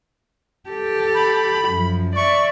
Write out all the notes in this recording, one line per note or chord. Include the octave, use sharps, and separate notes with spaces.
G4 A4
B5
F#2 F3
D5 E5 C#6